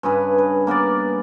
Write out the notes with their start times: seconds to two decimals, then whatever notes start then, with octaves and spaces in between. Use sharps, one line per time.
0.03 G2 C#3 G#4 B4
0.38 B4
0.67 A#3 B3 A#4 D5